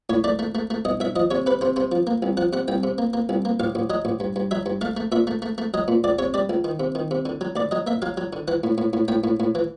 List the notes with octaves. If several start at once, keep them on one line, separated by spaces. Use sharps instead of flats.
A2 C#5
A3 D5
A3
A3
A3
B1 D#5
B1 E5
F3 D#5
C3 C#5
C3 B4
C3 C5
C3 C5
F3
A#3
C2
F3 F#5
C3 F#5
C2 G5
C3
A#3
A#3
C2
A#3
A1 F5
A1
F#3 D#5
A1
G2
G2
F#3 E5
G2
A3 F5
A3
A#2 E5
A3
A3
A3
F#3 D#5
A#2
C#2 D5
C3 C#5
G3 D5
C#2
D#3
C3
D#3
C3
D3
F#3
D2 D5
F#3 D#5
A#3 E5
F#3 F5
F#3
D3
E3 F#5
A2
A2
A2
A2 G5
A2
A2
E3